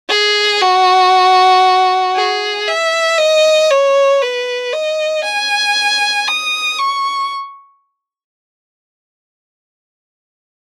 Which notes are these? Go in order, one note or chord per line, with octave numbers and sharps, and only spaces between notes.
G#4
F#4
G#4
E5
D#5
C#5
B4
D#5
G#5
D#6
C#6